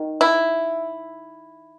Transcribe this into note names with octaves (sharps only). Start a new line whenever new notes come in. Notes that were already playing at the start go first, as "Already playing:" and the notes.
Already playing: D#3
E4